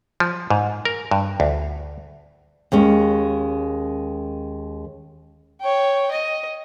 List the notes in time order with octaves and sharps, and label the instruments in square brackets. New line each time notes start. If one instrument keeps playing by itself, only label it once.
[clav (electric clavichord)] F3
G#2
A#4
G2
D2
[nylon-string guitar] D#2 G#3 C#4
[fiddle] C#5 G5
D#5